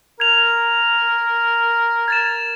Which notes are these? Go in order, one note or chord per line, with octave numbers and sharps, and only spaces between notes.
A#4 G#6 F7
G#6 A6 E7